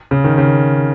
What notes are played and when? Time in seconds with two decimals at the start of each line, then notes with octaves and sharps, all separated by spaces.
0.11 C#3
0.24 D#3
0.38 C#3